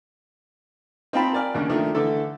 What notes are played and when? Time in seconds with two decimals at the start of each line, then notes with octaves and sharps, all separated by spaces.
1.13 C4 D#4 F4 G5 A5 B5
1.33 A#4 D5 G#5 F6
1.55 D#2 C#3 D4
1.69 D#3 F3 A3 D4
1.95 D3 E3 A3 A4